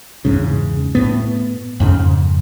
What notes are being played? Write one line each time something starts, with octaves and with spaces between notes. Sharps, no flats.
E2 G#2 C#3
A2 B3
F2 G#2 C#3